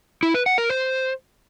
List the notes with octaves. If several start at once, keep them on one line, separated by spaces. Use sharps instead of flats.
E4
B4
F#5
A#4
C5